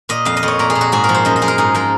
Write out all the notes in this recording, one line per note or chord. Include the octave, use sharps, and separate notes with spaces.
A#2 D#5
F2 F5
D#5
F2
C#5
A#2 A#4
G#4
A#2
F#4
G#2 G#4
A#4
F3
C5
F#2 D#5
D#5
F#2 G#4
A#4
G#2 G#4
F3 A#4